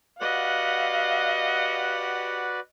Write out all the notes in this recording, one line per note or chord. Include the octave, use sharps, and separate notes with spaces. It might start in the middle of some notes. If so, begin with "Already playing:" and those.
F#4 G4 B4 D5 D#5 F5 F#5